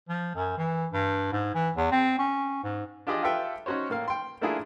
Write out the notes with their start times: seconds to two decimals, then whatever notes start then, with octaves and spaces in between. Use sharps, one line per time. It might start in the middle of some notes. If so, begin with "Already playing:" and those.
0.09 F3
0.35 F#2
0.57 E3
0.93 G2
1.32 G#2
1.55 E3
1.76 E2
1.92 C4
2.19 C#4
2.64 G#2
3.07 D4 F4 G4 G#4 D5 D#5
3.22 F4 G4 A4 B4 E5 G5
3.66 C#4 D#4 F#4 C5 C#5
3.90 A2 A#3 F5
4.08 G5 C6
4.41 A3 A#3 D4 E4 F4 G#4